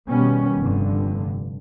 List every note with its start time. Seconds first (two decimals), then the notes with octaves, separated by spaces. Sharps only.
0.10 B2 D#3 G3 B3 C#4
0.58 F1 G2 D3